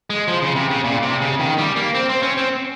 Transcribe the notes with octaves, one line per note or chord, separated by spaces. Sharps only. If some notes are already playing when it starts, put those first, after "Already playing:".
G#3
F3
C#3
C3
C#3
A#2
C3
C#3
D#3
G3
A#3
C4
C4
C#4
C4